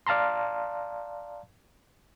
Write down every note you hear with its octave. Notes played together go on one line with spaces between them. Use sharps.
D5 F5 A5 A#5 C6